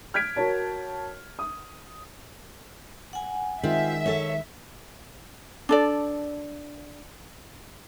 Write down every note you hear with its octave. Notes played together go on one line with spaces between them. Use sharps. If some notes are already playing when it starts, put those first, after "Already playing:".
F6 G6 G#6 B6 D7
F#4 A#4 C#5 A5
D#6
F#5 G#5
D#3 G#3 C4 F4 E5
A4 C#5
D4 A4 D5